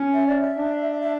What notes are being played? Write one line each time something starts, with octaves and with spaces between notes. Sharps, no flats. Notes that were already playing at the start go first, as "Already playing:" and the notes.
Already playing: C#4
E5
D5
E5
D4
E5